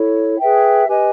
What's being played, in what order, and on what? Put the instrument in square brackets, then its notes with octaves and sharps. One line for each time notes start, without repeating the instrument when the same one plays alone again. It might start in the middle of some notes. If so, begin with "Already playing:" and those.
Already playing: [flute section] E4 A4 C#5
G#4 B4 E5 G5
G4 B4 D#5 G#5